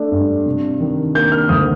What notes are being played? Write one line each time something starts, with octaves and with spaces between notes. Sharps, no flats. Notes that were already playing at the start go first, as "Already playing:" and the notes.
Already playing: A3 D4
G2
C3
D#3
A#3 G6
F6
D2 D#6